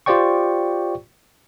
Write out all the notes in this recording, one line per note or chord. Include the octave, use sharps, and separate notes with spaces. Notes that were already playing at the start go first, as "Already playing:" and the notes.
F4 G4 C5 D5 G5 C#6